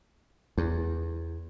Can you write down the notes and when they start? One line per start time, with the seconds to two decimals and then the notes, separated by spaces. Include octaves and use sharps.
0.58 E2